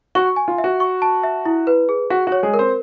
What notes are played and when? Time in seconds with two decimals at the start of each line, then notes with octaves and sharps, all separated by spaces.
0.15 F#4 C#6
0.36 G#5
0.48 F4
0.58 E5
0.64 F#4
0.80 C#6
1.02 A5
1.24 E5
1.45 E4
1.67 B4
1.89 G#4
2.10 F#4 F#5
2.27 F#4
2.32 C#5
2.43 G#3 G#4
2.54 A#4
2.59 C4 C5